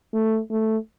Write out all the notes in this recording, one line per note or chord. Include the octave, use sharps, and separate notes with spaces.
A3
A3